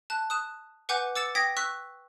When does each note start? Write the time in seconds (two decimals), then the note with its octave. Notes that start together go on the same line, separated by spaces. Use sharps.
0.10 A5 F#6
0.30 D#6 F#6 E7
0.89 B4 F#5 G#5 D6 F#6 G6
1.15 D6 E6 A6 C#7 E7
1.35 G5 D#6 G#6 A#6 B6
1.57 C#6 E6 F#6 B6